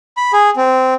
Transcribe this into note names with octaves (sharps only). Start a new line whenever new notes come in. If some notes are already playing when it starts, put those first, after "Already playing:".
B5
G#4
C4